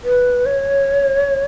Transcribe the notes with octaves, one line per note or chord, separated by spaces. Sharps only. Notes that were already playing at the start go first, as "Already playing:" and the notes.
B4
C#5